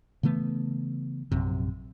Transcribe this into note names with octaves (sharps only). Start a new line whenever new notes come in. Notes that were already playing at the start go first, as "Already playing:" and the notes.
C#3 E3 A3 B3
A#1 F#2 C3